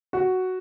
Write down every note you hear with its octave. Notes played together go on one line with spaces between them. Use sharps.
F#4